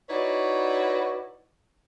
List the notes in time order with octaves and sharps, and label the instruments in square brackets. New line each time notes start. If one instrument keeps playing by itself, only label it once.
[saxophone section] D#4 E4 F#4 B4 C#5 D5